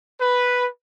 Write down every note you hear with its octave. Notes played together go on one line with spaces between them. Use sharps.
B4